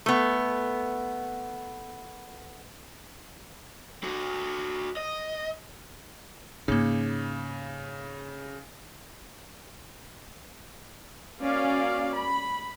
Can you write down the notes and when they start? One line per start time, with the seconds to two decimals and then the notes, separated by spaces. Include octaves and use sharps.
0.06 A3 B3
4.03 F#4 A4
4.97 D#5
6.68 G#2 C#3 A#3 C#4 D#4
11.40 A#3 C#4 F#4 D5 F5
12.15 B5